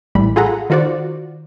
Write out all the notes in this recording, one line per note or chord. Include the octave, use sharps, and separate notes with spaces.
A#1 A2 E3 G3 B5
F4 G#4 A4 F#5 A#5 B5
D#3 F4 F#4 C5 D5